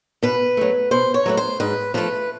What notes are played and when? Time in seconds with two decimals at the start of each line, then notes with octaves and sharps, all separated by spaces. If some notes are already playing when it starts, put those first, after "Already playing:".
0.23 B2 B4
0.57 F#3 A3
0.91 B2 C5
1.14 C#5
1.26 F#3 A3 B4
1.37 C5
1.60 G#2 B4
1.94 F3 A3 B4